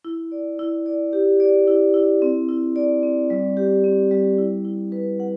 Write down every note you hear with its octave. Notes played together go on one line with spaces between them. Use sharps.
E4
D5
E4
D5
G4
D5
E4
E4
C4
E4
D5
C4
G3
G4
C4
G3
E4
E4
B4
F#5